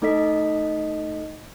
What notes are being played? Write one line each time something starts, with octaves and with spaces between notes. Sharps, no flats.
A3 D#4 A4 D#5 B6